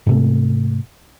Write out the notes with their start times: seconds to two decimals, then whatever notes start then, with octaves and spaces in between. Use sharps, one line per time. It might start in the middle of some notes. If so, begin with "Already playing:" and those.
0.07 G#2 C3 A3